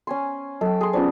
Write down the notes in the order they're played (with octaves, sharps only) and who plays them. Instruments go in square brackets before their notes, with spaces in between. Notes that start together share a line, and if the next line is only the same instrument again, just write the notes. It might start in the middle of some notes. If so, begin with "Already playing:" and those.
[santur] C#4 G#5 C6
[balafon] F#3 [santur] A4 G5
[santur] G#4 C6
[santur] B3 D4 [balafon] C#4 F4 C5